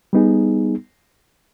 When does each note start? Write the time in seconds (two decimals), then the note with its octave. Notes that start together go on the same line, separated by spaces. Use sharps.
0.13 G3 B3 D#4 G#4